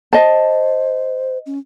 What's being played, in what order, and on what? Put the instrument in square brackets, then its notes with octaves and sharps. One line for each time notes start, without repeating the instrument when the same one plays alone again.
[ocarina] C5 [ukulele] D#5 A5
[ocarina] C#4